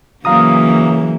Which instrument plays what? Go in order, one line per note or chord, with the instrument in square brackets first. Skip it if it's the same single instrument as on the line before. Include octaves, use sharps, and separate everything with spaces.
[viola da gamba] C#3 E3 [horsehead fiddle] F#3 A#3 [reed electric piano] F5 A#5 D#6